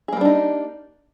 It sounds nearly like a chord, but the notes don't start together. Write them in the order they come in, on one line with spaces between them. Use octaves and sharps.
G#4 A#3 G3 D4 D#4